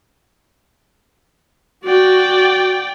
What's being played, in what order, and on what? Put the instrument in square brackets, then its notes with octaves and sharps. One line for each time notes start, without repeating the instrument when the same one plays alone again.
[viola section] F#4 [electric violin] D5 G5